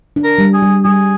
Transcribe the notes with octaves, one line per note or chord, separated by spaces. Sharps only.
D4
A#4
G3
G#4
G3
G3 G#4